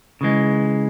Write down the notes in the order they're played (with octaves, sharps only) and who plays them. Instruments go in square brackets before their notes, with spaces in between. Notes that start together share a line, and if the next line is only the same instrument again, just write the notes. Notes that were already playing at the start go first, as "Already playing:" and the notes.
[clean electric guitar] C#3 E3 G#3